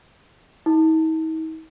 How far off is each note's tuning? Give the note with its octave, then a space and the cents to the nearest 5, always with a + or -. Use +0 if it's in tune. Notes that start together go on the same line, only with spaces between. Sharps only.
D#4 +45